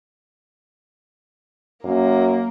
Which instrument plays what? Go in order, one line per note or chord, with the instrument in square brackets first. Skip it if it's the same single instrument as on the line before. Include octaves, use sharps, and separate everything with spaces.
[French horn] F#2 [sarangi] A#3